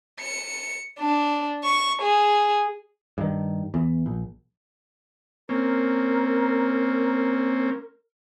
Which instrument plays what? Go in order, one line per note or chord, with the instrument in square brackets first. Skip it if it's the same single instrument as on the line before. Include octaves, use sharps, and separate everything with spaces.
[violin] C#7
D4
C#6
G#4
[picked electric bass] G2 D#3
E2
A#1
[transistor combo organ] A#3 C4 C#4 [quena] A#4